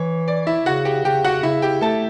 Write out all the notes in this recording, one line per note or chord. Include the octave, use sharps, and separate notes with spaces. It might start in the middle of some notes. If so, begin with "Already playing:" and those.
Already playing: E3 C#5
D5
E4 E5
C#3 F#4 F#5
G4 G5
C#3 G4 G5
F#4 F#5
C#3 E4 E5
G4 G5
A3 A4 A5